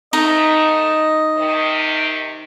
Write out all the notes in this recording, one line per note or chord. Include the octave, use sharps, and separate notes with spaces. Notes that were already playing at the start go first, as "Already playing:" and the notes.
G#2 A3 D#4 D#5
C3 D#3